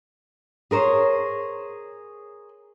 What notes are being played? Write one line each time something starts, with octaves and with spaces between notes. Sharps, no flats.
G#4 A#4 C5 C#5